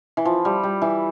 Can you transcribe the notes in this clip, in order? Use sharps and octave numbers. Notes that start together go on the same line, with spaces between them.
E3
F3
G3
G3
E3